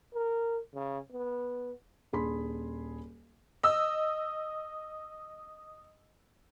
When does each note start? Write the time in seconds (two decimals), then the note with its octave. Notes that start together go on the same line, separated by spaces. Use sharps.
0.14 A#4
0.74 C#3
1.12 B3
2.13 D#1 D4 G#4 B5 C6 B6
3.63 D#5 E6